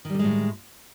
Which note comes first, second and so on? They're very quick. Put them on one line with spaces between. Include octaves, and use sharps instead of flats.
D#3 G3 D3 G#3 A2